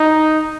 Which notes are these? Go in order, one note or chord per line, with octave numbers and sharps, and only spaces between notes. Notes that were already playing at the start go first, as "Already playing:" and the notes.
Already playing: D#4